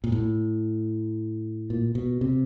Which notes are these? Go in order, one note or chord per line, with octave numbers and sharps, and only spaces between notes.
A#2
A2
A#2
B2
C3